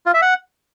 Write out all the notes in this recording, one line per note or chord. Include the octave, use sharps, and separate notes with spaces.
F4
E5
F#5